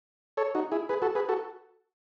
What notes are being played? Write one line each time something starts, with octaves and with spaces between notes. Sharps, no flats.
A4 C#5
D#4 F#4
E4 G#4
G#4 B4
F#4 A4
G#4 B4
F#4 A4